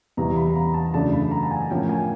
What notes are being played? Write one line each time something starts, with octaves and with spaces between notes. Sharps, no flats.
E2 C3 E3 G3 A#5
B5
A#5
A5
F#2 C#3 E3 A3 D4 A5
B5
A#5
A5
G#5
A2 F3 A#3 C#4 G5
G#5